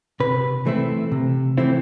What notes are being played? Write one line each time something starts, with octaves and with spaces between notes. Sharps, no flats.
C3 B4
E3 A3 C4 E4
C3
E3 A3 C4 E4